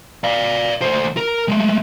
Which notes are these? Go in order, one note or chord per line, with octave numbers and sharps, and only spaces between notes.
D5 F5
D2 C5
A#4
G#3 A3